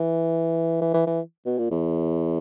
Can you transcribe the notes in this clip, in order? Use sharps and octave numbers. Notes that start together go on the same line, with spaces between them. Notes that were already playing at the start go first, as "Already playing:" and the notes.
Already playing: E3
E3
E3
E3
B2
A#2
E2